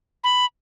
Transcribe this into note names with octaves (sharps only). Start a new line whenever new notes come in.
B5